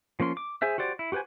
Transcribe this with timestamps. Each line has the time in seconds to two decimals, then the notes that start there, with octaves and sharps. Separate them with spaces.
0.20 F3 A#3 C#4 C6
0.37 D6
0.62 G#4 C5 E5
0.78 F#4 G4 C5 D5
0.99 E4
1.12 F#4 G4 B4 C5 G#5